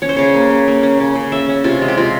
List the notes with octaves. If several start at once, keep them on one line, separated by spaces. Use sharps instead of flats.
C#4 C#5
C5
C#3 C#5
A#3
C#4
A#3
C#4
C#3
C#3
C#4 E5
C#4
C3 F4
G#3
G4
C3 F4